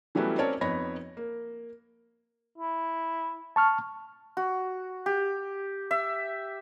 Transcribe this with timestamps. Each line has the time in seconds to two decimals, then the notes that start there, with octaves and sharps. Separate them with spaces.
0.15 E3 F#3 G3 A3 B3 C#4
0.38 C4 C#4 A#4 C#5 D5 A5
0.61 F2 B3 D#4 C#5 B5 A#6
1.17 A#3
2.58 E4
3.56 A5 C#6 F6
4.37 F#4
5.06 G4
5.91 E5